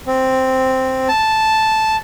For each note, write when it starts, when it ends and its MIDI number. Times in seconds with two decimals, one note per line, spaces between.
0.07 1.08 60
1.08 1.96 81